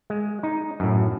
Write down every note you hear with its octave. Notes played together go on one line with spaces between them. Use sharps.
G#3
D#4
F#2 A2